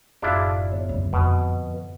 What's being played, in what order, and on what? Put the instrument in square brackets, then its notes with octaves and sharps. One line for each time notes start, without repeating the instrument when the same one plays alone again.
[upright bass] F#1 [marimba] F#2 A2 G#4 [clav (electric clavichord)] D4 E4 F4
[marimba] D3 B3 C#5
[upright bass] C#2 F#2
[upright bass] F2 [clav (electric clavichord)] B2